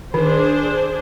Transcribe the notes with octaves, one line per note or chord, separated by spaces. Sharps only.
D#3 D4 G#4 C5